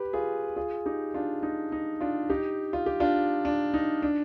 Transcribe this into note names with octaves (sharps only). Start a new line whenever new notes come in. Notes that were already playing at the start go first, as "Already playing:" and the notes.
Already playing: G4 B4
F4 G#4
F4 G#4
D#4 G4
D4 F4
D#4
D#4
D4 F4
D#4 G4
F4
G4
D4 F4
D4
D#4
D4